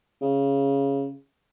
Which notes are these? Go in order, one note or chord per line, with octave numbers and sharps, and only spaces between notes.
C#3